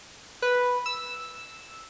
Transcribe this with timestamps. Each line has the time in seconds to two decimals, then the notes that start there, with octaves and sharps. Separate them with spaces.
0.42 B4
0.86 E6